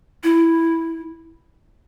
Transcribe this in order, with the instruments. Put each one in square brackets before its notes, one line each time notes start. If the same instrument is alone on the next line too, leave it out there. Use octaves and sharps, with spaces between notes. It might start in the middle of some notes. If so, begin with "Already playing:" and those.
[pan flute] E4